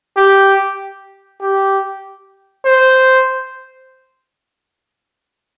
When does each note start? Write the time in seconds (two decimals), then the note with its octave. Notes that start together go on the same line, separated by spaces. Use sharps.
0.17 G4
1.41 G4
2.65 C5